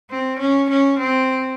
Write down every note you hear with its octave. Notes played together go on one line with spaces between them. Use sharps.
C4
C#4
C#4
C4